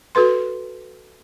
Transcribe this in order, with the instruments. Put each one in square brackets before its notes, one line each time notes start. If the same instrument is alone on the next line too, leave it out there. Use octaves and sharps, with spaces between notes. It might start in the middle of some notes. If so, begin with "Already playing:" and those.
[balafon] F#4 A4 B4 C6